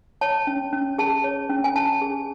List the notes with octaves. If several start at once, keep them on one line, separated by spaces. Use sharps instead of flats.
C#5 A5
C#4
C#4
G#4 A5
C#5
C#4
G#5
C#4 A5
G#4